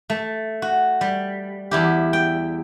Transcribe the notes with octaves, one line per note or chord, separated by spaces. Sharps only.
A3
F#4
G3
E2 E4 G4
G5